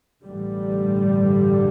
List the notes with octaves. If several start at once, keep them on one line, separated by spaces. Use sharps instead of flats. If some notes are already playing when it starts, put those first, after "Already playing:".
A1 G2 D3 G3